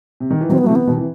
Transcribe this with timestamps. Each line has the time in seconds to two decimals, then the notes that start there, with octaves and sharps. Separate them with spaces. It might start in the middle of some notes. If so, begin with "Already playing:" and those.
0.20 C3
0.30 D#3
0.41 E3
0.49 D#3 F#3 C4
0.58 B3
0.64 F#3
0.67 C3 E3 A3
0.76 B3
0.87 B2 D#3
0.97 C3 E3